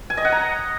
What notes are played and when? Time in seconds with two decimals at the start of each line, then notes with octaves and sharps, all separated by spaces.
0.10 G#5
0.17 D#5
0.25 F#5
0.32 A#5